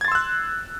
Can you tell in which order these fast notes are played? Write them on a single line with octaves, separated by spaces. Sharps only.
G#6 A6 C6 E6 F#6